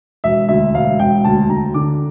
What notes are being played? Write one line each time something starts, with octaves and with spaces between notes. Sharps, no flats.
E1 E5
D2 E5
E1 F5
E1 G5
D2 A5
D2 A#5
D3 D6